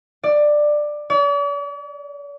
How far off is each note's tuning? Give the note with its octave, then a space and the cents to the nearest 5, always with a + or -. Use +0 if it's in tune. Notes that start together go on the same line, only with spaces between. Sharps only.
D5 +15
D5 -45